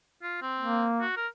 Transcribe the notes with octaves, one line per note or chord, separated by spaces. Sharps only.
F4
C4
A#3
F#4
A#4